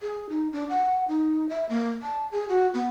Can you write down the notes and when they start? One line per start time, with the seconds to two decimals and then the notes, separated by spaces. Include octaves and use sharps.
0.01 G#4
0.30 D#4
0.52 D4
0.69 F#5
1.08 D#4
1.49 E5
1.69 A#3
2.02 A5
2.32 G#4
2.49 F#4
2.74 B3